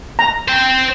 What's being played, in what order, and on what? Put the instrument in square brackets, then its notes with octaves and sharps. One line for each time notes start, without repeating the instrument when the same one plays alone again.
[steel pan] A#5
[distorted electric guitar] C5 G5